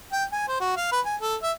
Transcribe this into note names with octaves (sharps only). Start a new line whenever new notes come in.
G5
G#5
C5
F#4
F5
B4
G#5
A4
E5